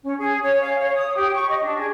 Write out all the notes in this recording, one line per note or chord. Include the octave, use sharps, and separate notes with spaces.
C#4
G#4
C#5
F5
C#5
D#6
G4
C#6
D#5
D4
G#4